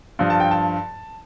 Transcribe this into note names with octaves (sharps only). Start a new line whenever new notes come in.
G2 F3
A5
G5
A5